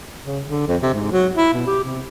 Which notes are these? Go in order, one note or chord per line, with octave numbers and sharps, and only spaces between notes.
C#3
D3
F2
C3
G#2
F#3
E4
B2
G4
C3